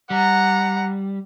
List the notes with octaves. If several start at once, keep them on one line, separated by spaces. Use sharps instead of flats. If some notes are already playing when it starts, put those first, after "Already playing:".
G3 F#5 A#5